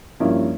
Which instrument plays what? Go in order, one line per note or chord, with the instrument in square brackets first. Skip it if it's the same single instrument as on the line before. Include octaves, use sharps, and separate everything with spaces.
[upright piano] G2 F3 A#3 C#4 E4